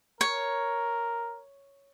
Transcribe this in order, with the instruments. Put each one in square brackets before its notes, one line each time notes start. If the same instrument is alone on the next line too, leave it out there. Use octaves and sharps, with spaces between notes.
[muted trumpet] A#4 [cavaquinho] C#5